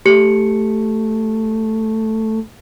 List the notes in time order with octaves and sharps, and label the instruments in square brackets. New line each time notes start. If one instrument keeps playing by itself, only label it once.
[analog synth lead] A3 [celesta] G4 C#7